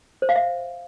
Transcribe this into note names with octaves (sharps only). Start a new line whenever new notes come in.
C5
F5
E5